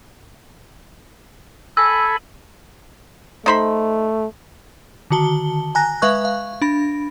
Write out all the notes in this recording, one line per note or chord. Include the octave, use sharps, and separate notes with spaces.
A4 G#5 B5 E6
A3 D#4 C5 B5
D3 D#3 F#4 A5 G7
G#5 A#5 F#6 A#6
G#3 B4 E5 F5 C#6 F#6
F5
D4 B5 A#6